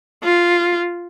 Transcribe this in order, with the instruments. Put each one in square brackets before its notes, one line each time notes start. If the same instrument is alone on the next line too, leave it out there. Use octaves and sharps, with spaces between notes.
[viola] F4